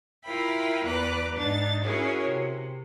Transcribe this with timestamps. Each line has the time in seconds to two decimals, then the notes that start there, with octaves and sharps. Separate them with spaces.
0.25 E4 F4 A#4 E5 G5 B5
0.84 E2 B4 D5 A#5 D6 F#6
1.33 G#2 D4 D#4 A6
1.82 C#4 E4 F#4 G#4 A#4 C#5
2.27 C3